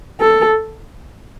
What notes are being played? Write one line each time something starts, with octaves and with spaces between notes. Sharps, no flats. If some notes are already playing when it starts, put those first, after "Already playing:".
A4